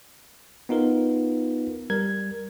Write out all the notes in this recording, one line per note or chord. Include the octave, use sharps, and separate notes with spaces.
B3 D#4 F4 A#4 B4
G3 A#4 G#6